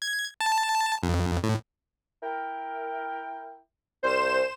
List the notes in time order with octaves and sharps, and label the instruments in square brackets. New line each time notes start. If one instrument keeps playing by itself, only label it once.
[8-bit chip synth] G#6
A5
F2
A2
[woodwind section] E4 A#4 G5
[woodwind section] C2 [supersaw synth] C5 E7